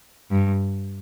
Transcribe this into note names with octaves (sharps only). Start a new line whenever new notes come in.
G2